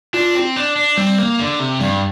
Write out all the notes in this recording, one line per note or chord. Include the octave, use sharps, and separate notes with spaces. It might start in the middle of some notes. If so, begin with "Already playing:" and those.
D4 F4
C4
D4
D4
G3 C4
A#3
D3
C3
G2 G3